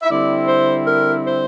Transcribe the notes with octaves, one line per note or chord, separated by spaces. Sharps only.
E5
D3 G3 C4 E4 D5
C5
A#4
C5